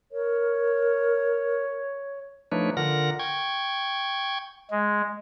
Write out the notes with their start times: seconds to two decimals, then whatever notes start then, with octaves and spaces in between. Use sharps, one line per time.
0.12 A#4 C#5
2.52 F3 A3 D4 D#4 B4 C#5
2.77 D3 F4 A#4 F#5 A#6
3.19 G5 C#6 G#6
4.71 G#3